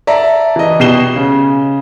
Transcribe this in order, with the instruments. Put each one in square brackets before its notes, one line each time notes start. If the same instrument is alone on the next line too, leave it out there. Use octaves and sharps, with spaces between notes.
[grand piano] D5 E5 A5 A#5
E3 D#5
B2 G4 C7 E7 G7
C#3